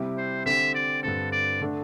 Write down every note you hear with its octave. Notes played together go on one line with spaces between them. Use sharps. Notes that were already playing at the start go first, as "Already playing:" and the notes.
Already playing: C3 G3 C4 E4 G4
C5
D3 C4 G4 E5
D5
G2 D3 C4 A4
D5
D3 A3 D4